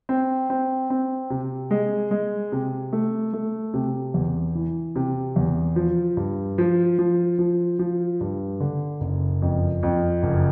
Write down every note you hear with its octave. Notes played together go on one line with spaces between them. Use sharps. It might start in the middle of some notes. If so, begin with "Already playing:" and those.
C4
C4
C4
C3
G#3
G#3
C3
A3
A3
C3
E2
E3
C3
E2
F3
G2
F3
F3
F3
F3
G2
D3
F#1
F2
F2
F#1